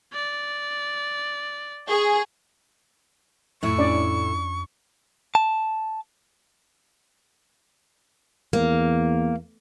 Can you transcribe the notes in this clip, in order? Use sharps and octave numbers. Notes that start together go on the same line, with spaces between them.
D5
G#4 C#6
F2 A2 E4 C#6
C#4 D4 D5
A5
E2 A#3